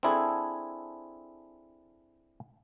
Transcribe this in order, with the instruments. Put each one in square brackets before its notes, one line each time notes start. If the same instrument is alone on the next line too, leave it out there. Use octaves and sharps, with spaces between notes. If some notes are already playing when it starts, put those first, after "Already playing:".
[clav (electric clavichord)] C4 D4 E4 G#4 A4